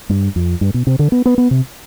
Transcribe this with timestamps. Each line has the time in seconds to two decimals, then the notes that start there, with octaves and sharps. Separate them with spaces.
0.09 G2
0.36 F2
0.61 G2
0.74 B2
0.87 C3
0.99 D3
1.12 B3
1.25 B3
1.38 B3
1.51 C3